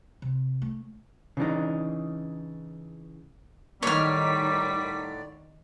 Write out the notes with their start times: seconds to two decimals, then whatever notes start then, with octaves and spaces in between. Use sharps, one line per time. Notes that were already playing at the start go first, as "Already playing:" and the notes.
0.22 C3
0.62 A3
1.37 C#3 E3 D4 D#4
3.83 A2 D3 D#3 G3 C#5 D5 F6 B6